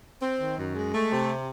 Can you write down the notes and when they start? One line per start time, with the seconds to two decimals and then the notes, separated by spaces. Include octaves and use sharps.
0.22 C4
0.40 D#3
0.57 F#2
0.75 G#3
0.93 A3
1.11 C3